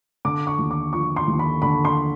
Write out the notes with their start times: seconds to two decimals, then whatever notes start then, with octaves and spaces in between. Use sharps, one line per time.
0.25 D3 D6
0.47 C#6
0.59 D#2
0.71 D6
0.93 F3 C#6
1.16 C6
1.28 D#2
1.39 B5
1.62 D3 B5
1.85 C6